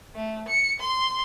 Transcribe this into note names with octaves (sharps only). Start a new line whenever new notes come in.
A3
C#7
C6